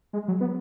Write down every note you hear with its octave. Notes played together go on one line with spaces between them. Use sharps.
G#3
F#3
B3